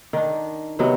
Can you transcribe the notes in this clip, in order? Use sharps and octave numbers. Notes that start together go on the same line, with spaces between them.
D#3 D4
C3 D#3 F#3 B3